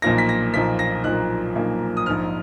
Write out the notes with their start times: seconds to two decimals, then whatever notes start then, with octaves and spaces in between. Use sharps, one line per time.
0.02 B1 A#2 F3 A#3 A#6
0.18 B6
0.29 A#6
0.54 B1 A#2 F3 A#3 B6
0.79 A#6
1.04 B1 A#2 F3 A#3 F#6
1.55 B1 A#2 F3 A#3
1.97 D#6
2.06 A#1 G#2 F3 F6